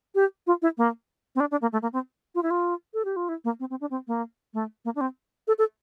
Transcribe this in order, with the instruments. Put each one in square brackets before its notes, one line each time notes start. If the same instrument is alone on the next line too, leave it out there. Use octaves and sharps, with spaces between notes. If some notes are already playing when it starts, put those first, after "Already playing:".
[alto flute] G4
F4
E4
A#3
C4
D4
D4
A#3
A3
A#3
C4
F4
E4
F4
A4
G4
F4
E4
A#3
C4
C4
D4
C4
A#3
A3
A#3
D4
C4
A4
A4